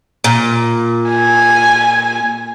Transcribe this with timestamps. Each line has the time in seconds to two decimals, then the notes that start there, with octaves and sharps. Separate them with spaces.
0.24 A#2
1.10 G#5